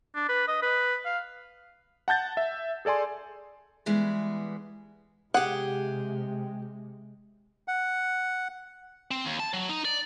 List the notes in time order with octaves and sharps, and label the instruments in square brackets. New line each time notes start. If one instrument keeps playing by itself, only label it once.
[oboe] D4
B4
D#5
B4
F5
[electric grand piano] F#5 A5 G6 A6
E5
G#4 A4 D5 G#5 C6
[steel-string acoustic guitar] E3 G3 G#3 B3
[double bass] C3 G#3 [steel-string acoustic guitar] G4 G#4 [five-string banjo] F#5
[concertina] F#5
[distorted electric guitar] C4
D#2
A5
F#3
D#4
D5